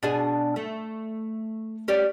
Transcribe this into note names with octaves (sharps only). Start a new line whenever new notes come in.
B2 D4 G#4
A3
C#4 G4 D5